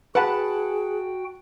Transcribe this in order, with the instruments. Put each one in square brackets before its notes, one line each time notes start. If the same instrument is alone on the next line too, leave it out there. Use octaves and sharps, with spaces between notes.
[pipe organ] F#4 G5 [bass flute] G#4 [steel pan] B4 [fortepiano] F#5 A5